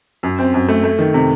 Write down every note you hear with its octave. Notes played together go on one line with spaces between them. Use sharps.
F#2
C4
F#2
A3
A3
D#3
C3